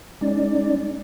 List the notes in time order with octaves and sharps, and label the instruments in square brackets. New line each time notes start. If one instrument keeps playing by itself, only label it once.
[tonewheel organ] G#3 C#4 D#4 D5